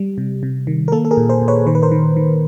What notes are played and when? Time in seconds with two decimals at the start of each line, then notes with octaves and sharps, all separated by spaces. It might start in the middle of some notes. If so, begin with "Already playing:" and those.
Already playing: G3
0.18 C3
0.43 C3
0.67 D#3
0.88 A#4
0.92 A#3 A4
1.05 A4
1.11 G#4 A#4
1.17 A#2
1.30 A#4 C5
1.42 A#2
1.48 B4 C#5
1.67 D#3 C5
1.75 B4
1.82 A#4 C5
1.91 D#3
2.16 D#3